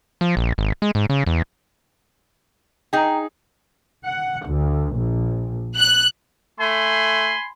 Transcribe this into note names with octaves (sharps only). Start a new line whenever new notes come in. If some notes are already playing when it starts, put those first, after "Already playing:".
F3
A#1
G#1
G#3
G#2
C#3
E2
D#4 G#4 G5 A#5
F#5
D2
A#1
F#6
A3 G#5 B5 C6